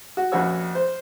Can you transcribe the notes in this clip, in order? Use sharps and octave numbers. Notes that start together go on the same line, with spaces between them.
F#4
A#1 F2 C#4 F#4 C#5 E6
C5